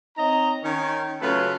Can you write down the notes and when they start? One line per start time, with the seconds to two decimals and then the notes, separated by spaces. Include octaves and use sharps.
0.17 C4 D#4 C#5 D#5 A#5
0.63 D#3 C#4
1.21 C#3 F#3 A3 F4 A4 B4